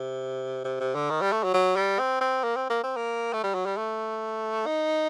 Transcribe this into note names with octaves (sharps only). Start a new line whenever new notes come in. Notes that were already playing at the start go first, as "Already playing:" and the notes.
Already playing: C3
C3
C3
D3
D#3
G3
A3
F#3
F#3
G3
C4
C4
A#3
C4
A#3
C4
A#3
A3
G3
F#3
G3
A3
D#4